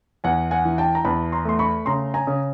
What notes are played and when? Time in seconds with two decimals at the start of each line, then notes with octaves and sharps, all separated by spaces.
0.24 E2 F#5 G#5
0.51 F#5 G#5
0.65 E3
0.78 G5 A5
0.95 A#5
1.05 E2 A5 B5
1.32 A#5 C6
1.45 A3 C6
1.59 B5 C#6
1.86 C#3 A#5 C6
2.14 G#5 A#5
2.27 C#3